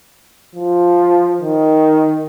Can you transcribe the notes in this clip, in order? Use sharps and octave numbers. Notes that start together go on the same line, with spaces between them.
F3
D#3